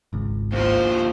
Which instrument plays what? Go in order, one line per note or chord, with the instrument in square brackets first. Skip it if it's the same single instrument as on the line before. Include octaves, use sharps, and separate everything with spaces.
[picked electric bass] G#1 C#2
[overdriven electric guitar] D#2 F3 [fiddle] C5